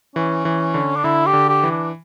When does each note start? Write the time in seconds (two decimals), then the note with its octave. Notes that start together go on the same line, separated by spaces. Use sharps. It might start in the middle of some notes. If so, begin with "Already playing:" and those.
0.15 E3 C#4
0.45 E3
0.74 D3
0.96 D4
1.04 D3 E4
1.26 G4
1.33 D3
1.49 G4
1.63 E3
1.71 D4